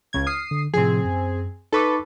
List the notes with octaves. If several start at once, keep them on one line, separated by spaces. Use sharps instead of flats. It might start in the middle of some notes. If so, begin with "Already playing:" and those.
C#2 C#3 G#6
D#6 F6 C7
D3
A2 C3 F3 C4 G#4
F#2
D#4 A4 B4 C#6 D6